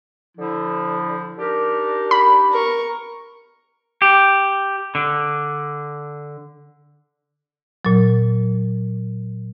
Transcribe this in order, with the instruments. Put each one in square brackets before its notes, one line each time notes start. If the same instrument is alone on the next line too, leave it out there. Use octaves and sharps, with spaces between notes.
[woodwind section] D3 F3 [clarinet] E4
[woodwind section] D4 D#4 G4 [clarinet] A#4
[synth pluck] B5
[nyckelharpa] A#4 C#6
[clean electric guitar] G4
D3
[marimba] A#2 F#3